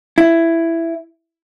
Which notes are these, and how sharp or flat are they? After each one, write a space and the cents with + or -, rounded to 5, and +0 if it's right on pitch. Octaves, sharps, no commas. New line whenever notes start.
E4 +10